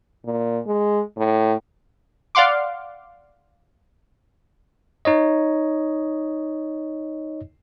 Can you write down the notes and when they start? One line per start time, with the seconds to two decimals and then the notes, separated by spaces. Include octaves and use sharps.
0.25 A#2
0.67 G#3
1.17 A2
2.35 D5 F5 F#5 C6 D6
5.05 D#4 C#5 D#5